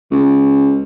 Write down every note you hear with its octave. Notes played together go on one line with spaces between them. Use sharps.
C#2